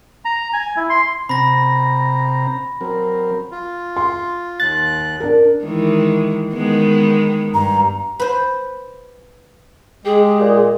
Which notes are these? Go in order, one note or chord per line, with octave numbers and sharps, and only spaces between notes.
A#5
G#5
E4
C6
C3 C4 A#5 B5 A#6
F#3 C4 A#4
F4
C6
D#2 F#6 A6
D4 A#4
D#3 E3 G#3
D#3 G#3 B3
G2 A#5
B4 C5
G#3 G4 G#4
A#2